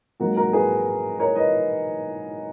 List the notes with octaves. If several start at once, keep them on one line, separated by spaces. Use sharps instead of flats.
G#1 G#2 F#3 A#3 F#4 A#4
F#4 A#4
G#4 B4
A#4 C#5
B4 D#5